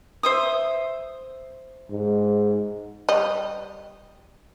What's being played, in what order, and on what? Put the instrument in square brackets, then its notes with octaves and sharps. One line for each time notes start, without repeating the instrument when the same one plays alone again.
[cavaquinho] C5 E5 D#6
[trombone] G#2
[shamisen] G3 D#5